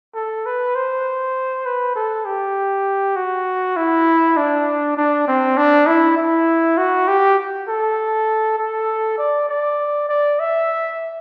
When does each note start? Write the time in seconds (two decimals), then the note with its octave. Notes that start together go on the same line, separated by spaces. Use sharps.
0.15 A4
0.46 B4
0.75 C5
1.66 B4
1.96 A4
2.25 G4
3.16 F#4
3.77 E4
4.37 D4
4.97 D4
5.27 C4
5.57 D4
5.87 E4
6.17 E4
6.78 F#4
7.08 G4
7.68 A4
8.58 A4
9.18 D5
9.49 D5
10.09 D5
10.40 E5